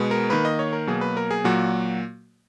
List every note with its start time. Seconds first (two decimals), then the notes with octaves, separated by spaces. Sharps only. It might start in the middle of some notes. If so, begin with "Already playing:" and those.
Already playing: B2 G#3 B3
0.11 A#4
0.30 D#3 A#3 B4
0.45 D#5
0.59 C#5
0.73 A#4
0.87 B2 F#3 A#3 G#4
1.01 B4
1.17 A#4
1.31 G#4
1.44 A#2 F#3 A#3 F#4